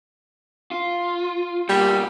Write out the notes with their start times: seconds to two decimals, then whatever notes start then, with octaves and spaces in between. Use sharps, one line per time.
0.71 F4
1.69 B2 G3 A#3